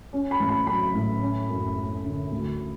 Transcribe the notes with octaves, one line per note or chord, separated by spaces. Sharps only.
C#4
B5
A1
B5
F#3 B5
A2
C#4
F#2
A3
D3
D2